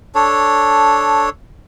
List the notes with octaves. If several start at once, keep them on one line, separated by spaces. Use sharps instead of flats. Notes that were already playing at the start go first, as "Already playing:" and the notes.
D4 A4 C#5